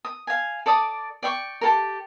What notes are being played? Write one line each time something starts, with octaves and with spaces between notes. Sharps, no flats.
D#6
F5 G#5
A4 D5 D6 D#6
D5 G5 C#6
G4 A4 A#4